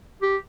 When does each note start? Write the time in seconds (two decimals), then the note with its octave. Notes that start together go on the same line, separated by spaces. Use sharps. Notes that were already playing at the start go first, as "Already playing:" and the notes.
0.22 G4